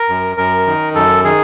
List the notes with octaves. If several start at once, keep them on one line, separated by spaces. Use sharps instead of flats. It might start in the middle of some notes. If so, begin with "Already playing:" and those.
Already playing: A#4
F#2
F#2 A#4
D#3
F#2 A4
D#3 G#4